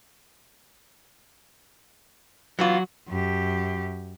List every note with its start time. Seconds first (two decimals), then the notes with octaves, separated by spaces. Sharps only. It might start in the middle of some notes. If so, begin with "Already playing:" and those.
2.59 E3 F#3 B3 F4 F#4
3.08 F#2 G4